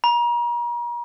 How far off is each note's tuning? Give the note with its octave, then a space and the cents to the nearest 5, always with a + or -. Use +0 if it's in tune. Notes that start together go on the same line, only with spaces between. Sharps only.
A#5 +40